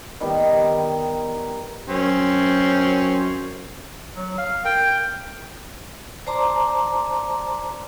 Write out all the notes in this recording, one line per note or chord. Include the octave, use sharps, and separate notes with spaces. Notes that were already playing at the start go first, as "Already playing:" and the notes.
D#3 G3 B3
F#2 C4 C#4
F#3
F5
A#4 G5
C5 D5 A5 A#5 C6 D6